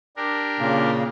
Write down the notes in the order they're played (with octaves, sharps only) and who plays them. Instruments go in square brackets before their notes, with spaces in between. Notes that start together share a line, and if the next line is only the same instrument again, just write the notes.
[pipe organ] D4 G4 A#4
[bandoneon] A#2 C#3 A#3